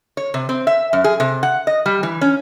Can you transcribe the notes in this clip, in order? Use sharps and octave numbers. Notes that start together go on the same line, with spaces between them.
C#5
C3
C4
E5
F#2
G#4
C3
F#5
D#5
G3
E3
C#4